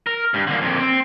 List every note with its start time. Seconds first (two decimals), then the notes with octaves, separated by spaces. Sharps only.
0.07 A#4
0.34 G2
0.48 D3 A#3
0.61 F2 A#2
0.79 C4